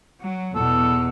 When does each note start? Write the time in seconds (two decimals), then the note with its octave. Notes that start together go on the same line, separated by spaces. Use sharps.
0.20 F#3
0.55 E2 B2 A4